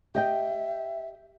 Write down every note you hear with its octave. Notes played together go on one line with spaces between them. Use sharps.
G4 D#5 E5 G5